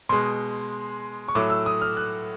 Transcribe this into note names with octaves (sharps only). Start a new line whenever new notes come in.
B2 G#3 C6
C#6
A2 F#3 A3 D6
E6
D#6
F6
F#6